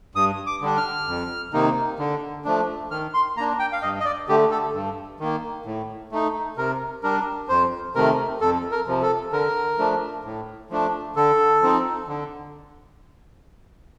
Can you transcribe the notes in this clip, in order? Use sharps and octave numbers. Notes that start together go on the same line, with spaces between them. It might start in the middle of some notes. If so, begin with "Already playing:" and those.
G2 D#6
D6
D3 G3 D4
F6
F2
C3 D#3 A#3 D#4
D3
F3 A3 D4
D#3 F6
C6
A#3 D4 A#5
G5
F5
G2 D#5
D#5
D5
D3 A3 G4
A4
G2
D#3 A#3
A2
A3 D#4
C3 A#4
G3 D4 A#4
F2 C5
C3 D#3 A3 A#4
F2 A4
A#4
C3 F3
A4
D3 A#4
F3 A3 D4
A2
F3 A3 D4
D3 A4
F3 C4 D#4
D3